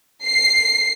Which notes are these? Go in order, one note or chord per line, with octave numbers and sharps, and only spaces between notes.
C7